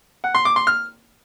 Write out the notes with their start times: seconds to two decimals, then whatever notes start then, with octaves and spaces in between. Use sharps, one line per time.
0.24 F#5
0.35 C6
0.45 D6
0.56 C6
0.67 F6